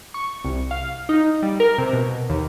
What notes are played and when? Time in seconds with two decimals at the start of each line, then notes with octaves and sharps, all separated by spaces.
0.14 C#6
0.44 C2
0.71 F5
1.09 D#4
1.43 G3
1.60 A#4
1.78 C3
1.93 B2
2.30 D#2